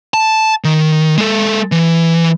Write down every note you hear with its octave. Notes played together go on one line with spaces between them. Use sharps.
A5
D#3
G#3 A4
E3